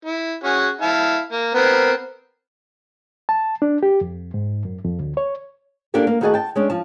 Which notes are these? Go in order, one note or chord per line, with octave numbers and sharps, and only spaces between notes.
E4
C#4 F#4 G#4
E4 F5 A5
A#3
B3 C4 A#4
A5
D4
G4
F2
G#2
F#2
F2
D2
C#5
A#3 D4 F4 G4 A4 A#4
A#3
D#3 A3 F#4 G#4 D#5 A5
G5 A5
G#3 C#4 D4
F3 A5